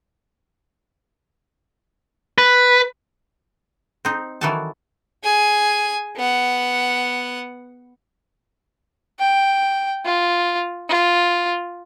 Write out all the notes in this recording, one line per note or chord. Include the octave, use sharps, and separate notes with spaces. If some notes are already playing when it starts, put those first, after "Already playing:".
B4
C4 D#4
D#3 E3 F#3 A4 G#5 A5
G#4 G#5
B3 F#5
G5
F4
F4